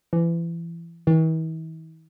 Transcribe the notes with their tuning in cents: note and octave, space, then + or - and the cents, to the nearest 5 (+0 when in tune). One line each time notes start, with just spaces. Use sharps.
E3 +30
E3 -45